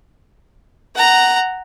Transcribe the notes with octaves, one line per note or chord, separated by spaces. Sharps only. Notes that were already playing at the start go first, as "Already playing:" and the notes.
F#5 A#5